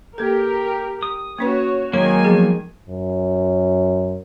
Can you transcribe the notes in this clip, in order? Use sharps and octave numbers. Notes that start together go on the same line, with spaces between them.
A#3 G4 A4 A#4
D#6
A#3 C#4 F#4 B4 C#5
D#3 F#3 G#3 A#3 C#5 G#5
F3 B3 G#4
F#2